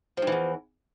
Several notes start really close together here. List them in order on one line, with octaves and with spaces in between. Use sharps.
F3 G2 E3 E2